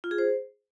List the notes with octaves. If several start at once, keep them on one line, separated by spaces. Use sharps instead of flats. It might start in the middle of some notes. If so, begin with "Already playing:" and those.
F4
G#4
C5